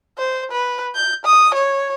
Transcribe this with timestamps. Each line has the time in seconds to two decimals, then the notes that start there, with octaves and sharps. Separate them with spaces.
0.18 C5
0.51 B4
0.95 G6
1.25 D#6
1.54 C#5